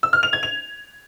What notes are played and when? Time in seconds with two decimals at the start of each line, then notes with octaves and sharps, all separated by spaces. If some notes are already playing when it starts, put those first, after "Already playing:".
0.03 E6
0.13 F6
0.23 F7
0.33 G#6
0.43 F7